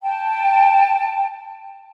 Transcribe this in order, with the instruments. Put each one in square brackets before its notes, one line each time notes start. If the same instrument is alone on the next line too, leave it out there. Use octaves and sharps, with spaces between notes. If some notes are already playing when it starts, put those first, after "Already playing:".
[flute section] G5 A5